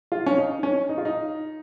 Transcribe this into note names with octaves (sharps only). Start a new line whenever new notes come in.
F4
C#4
D#4
C#4
D#4
F4
D#4